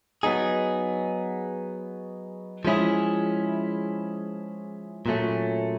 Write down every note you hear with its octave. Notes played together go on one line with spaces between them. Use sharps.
F#3 B3 D#4 G#4
F3 G#3 C#4 E4 G#4
A#2 F#3 A3 C#4